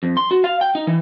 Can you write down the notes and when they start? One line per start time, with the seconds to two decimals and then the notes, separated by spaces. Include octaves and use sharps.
0.03 F2
0.17 C6
0.31 F#4
0.44 F5
0.61 G5
0.75 D#4
0.87 E3